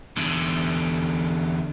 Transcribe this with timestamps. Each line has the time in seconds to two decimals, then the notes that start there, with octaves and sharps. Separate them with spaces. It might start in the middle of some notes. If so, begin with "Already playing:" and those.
0.17 E2 D3